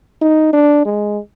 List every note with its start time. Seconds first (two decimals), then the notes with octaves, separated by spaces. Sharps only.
0.21 D#4
0.53 D4
0.85 G#3